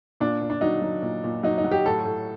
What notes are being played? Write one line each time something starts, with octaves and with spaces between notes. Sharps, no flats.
A#2 D4
A#2
D4
F#3 D#4
F#3
A#2
A#2
F#3 D#4
D#4
F#3
G4
A2 A4
A2